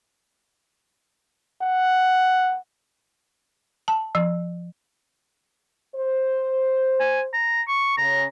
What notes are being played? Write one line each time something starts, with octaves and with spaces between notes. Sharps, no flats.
F#5
A5
F3
C5
G#5
A#5
C#6
C#3 A#5